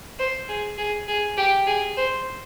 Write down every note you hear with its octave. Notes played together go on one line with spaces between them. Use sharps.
C5
G#4
G#4
G#4
G4
G#4
C5